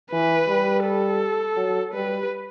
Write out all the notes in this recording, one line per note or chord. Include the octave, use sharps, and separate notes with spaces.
E3 B4
G3
A4
F#3
G3 B4